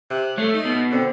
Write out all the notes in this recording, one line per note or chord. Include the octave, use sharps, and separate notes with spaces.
C3 F#6
A3 C#5 C7
D#4
B2
D3 C4